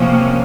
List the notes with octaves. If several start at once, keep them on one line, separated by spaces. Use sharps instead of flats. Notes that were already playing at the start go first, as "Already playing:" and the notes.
Already playing: C3 F3 A#3 C#4